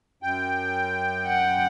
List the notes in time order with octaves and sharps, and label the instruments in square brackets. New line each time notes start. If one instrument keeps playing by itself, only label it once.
[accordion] F#2 G5
[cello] F#5